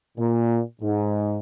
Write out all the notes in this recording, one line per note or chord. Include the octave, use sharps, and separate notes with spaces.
A#2
G#2